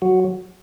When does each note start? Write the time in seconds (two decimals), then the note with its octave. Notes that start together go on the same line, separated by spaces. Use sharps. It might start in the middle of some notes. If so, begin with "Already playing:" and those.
0.02 F#3 F#4